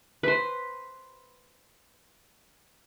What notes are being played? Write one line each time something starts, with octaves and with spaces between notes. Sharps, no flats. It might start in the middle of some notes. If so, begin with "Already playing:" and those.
B4 C5